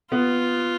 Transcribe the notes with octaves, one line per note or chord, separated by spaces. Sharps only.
B3 F4